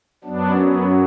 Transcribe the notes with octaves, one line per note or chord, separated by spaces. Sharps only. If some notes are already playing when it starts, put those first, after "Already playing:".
F#2 F#3 B3 D4
B3